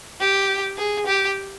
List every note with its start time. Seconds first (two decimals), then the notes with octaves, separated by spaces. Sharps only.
0.20 G4
0.78 G#4
1.07 G4